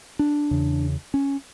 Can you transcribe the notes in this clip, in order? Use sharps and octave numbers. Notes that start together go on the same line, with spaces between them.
D4
E2 C#3
C#4